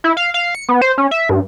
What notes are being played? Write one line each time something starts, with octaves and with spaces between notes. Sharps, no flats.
E4
F5
F5
C#7
B3
C5
C#4
E5
G2